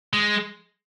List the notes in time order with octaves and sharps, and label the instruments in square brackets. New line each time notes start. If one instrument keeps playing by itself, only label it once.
[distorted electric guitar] G#3